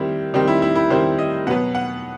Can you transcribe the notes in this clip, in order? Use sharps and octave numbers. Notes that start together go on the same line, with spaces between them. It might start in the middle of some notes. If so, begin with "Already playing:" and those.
Already playing: D#3 G3 C4 E4
D#3 G3 C4 D#4
E4
E4
E4
D#3 G3 C4 C5
D#5
B2 F#3 B3 F#5
F#5